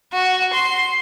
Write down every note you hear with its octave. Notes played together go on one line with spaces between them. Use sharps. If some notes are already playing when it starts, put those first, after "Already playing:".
F#4
C6